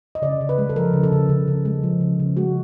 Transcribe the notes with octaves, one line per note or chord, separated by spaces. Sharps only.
D#5
C#3 D5
C#3
B4
G#3
A4
F3 A#4
C#3
A4
C#3
C#3
C#3
G#3
F3
C#3
C#3
G#3 F#4